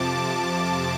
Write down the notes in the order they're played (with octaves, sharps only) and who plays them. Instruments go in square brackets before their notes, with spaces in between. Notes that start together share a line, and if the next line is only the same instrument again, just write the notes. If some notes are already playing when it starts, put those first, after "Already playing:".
Already playing: [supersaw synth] F2 C3 F3 A5 D6